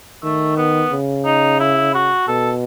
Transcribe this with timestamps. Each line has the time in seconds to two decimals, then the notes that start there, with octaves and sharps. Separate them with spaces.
0.23 D#3 A3
0.57 B3
0.92 C#3
1.26 D#4
1.60 E4
1.95 F#4
2.28 B2 A4